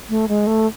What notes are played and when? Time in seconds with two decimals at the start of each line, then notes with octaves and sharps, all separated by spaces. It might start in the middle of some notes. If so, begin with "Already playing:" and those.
0.09 A3
0.28 G#3
0.47 A3